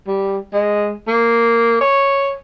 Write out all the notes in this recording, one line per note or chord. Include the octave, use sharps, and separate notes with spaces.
G3
G#3
A#3
C#5